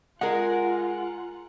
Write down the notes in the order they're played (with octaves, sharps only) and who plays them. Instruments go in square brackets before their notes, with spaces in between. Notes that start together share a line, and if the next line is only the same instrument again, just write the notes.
[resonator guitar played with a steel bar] G#3 G#4 A#4 [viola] F4 [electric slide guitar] F#5